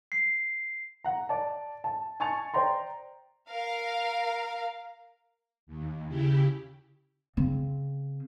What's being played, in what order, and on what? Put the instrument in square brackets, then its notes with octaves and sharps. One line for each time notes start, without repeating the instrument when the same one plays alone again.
[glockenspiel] C7
[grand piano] F#5 A#5
D5 A5
A5
G#5 A5 C#6 A6 C#7 F7
C5 D5 G5 A#5 C6
[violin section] A#4 F5
[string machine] D#2
C#3 E4 G4
[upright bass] C#3 C4